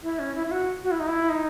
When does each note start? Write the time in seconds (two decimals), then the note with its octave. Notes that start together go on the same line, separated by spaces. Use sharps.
0.03 E4
0.19 C#4
0.35 E4
0.46 E4
0.51 F#4
0.83 F#4
0.91 E4
1.00 D#4
1.08 E4
1.29 D#4